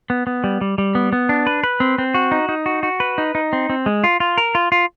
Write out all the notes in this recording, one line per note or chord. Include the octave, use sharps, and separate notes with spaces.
B3
B3
G3
G3
G3
B3
B3
D4
B4
B4
C4
C4
F#4
D#4
D#4
F#4
F#4
B4
D#4
D#4
C4
C4
G#3
F4
F4
A#4
F4
F4